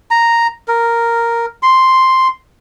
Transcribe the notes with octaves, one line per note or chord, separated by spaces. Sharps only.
A#5
A#4
C6